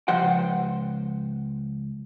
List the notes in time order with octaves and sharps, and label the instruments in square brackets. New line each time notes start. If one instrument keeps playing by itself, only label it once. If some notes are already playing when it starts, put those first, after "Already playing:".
[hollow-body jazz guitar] C#2 F3 C5 F#5 G5